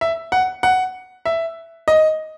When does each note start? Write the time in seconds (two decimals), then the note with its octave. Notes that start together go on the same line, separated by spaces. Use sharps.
0.01 E5
0.32 F#5
0.63 F#5
1.25 E5
1.88 D#5